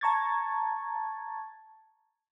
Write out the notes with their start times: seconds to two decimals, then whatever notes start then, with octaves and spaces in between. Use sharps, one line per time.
0.01 A5 A#5 C#6 G#6 A6